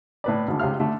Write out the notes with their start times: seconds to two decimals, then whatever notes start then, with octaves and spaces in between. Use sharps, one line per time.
0.24 A2 B4 D5
0.47 G#1 D3
0.59 C#2 C3 F5 F6
0.80 D3 A3